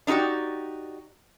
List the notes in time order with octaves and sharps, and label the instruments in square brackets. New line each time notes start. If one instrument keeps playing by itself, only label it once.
[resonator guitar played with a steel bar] D4 D#4 F#4 G4 D5